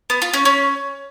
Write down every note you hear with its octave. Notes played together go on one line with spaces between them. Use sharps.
B3
F4
C#4
C#4